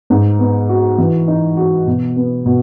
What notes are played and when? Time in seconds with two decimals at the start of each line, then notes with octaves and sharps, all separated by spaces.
0.10 G#2
0.39 B3
0.69 F#4
0.98 E3
1.28 D#4
1.57 F#4
1.87 B2
2.16 B3
2.46 B2